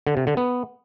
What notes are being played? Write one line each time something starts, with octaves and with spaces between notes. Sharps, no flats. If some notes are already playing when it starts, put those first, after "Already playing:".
D3
C3
D3
B3